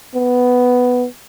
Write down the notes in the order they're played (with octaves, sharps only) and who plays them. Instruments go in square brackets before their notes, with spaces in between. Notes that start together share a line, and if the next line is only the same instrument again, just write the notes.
[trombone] B3